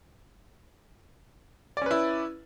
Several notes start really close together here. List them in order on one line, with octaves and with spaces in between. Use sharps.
D5 C#4 B4 E4